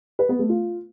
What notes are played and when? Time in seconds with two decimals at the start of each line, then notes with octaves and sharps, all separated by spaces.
0.19 B4
0.29 B3
0.39 A3
0.49 F4